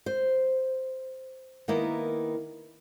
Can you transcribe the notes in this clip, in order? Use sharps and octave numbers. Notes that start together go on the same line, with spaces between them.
C5
D#3 A#3 B3 E4